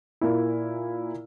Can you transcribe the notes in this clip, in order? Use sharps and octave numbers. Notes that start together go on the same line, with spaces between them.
A#2 A#3 E4